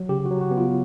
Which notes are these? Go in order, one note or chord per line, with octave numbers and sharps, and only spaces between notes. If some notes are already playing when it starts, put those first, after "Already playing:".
Already playing: F#3
C#3 G4
F#3 F#4
F#4
B3
F4